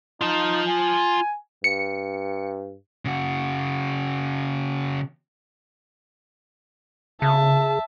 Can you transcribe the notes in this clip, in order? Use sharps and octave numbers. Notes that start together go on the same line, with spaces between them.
D#4 F4 A5
G#5
G2 C#7
C#3 F#4
C#3 E5 A5